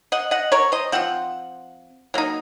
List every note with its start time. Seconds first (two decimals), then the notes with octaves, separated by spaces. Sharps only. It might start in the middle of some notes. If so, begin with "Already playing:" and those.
0.12 D#5 F#5
0.31 D#5 F#5
0.52 A#4 C#5
0.72 C5 D#5
0.92 F3 C4 F4 F#5
2.14 F#3 A#3 D#4